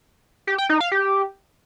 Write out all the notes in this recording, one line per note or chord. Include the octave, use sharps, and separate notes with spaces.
G4
G5
D#4
F5
G4